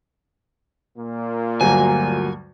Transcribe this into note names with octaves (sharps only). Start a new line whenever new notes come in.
A#2 A#3
D2 G2 F#3 G#5